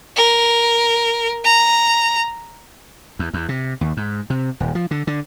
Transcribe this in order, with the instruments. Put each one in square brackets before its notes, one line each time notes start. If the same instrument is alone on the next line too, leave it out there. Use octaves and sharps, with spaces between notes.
[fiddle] A#4
A#5
[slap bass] E2
E2
C3
D#2
G#2
C3
D#1
F3
D3
D3